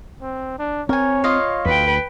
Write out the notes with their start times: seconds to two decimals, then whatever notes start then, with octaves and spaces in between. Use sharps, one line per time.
0.21 C4
0.59 D4
0.89 C4 A#4 C#5 G#5
1.24 F4 D#5 F5
1.66 D2 B4 G5